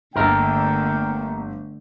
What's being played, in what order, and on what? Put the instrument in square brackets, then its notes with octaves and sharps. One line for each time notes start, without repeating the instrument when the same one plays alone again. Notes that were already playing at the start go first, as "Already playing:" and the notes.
[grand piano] G1 E5 [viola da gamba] D3 A3 [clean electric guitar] A#3 A4 A#4 [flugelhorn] G5